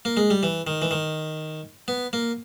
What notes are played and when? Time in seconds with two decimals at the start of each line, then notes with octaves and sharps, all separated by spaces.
0.05 A#3
0.17 G#3
0.30 G3
0.43 E3
0.67 D#3
0.82 E3
0.91 D#3
1.88 B3
2.13 A#3